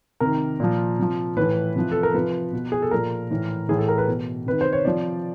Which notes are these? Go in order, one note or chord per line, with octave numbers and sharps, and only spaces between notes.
C3 D#3 A#4
A#2 F3
C3 F3
A2 E3 B4
C3 F3
A4
A#4
C3 F3 B4
B2
G#4
A4
A#2 F3 A#4
A2 E3
A2 E3 G#4
A4
A#4
B4
B2
C3 D#3 B4
C5
C#5
C3 F3 D5